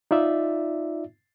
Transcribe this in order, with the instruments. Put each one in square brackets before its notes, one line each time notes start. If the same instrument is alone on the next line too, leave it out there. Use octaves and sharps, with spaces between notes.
[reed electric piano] D#4 F4 D5 E5